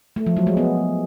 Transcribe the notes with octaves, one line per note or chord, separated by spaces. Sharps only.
A3
F3
F#3
G#3
B3